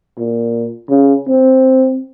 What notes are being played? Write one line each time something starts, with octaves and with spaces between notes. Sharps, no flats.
A#2
C#3
C4